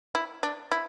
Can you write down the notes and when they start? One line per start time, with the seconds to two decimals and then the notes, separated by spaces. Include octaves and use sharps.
0.15 E4
0.43 D4
0.72 E4